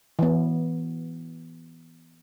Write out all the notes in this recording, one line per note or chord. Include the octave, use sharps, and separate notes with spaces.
E3 B3